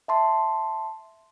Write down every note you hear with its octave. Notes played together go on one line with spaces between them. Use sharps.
E5 A5 C6